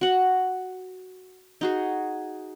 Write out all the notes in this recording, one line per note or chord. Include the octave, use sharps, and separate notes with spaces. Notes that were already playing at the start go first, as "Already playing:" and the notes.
F#4 F#5
D#4 F#4 G#4